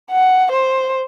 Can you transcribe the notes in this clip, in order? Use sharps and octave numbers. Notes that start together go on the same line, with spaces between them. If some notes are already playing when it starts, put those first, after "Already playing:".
F#5
C5